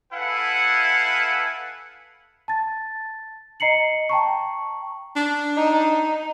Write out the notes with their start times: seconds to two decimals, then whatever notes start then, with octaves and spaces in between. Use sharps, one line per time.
0.13 E4 A4 B4 F5 F#5 G#5
2.48 A5 A6
3.60 D#5 A#5 C7 C#7 F#7
4.09 G5 A5 A#5 C#6
5.16 D4
5.56 D#4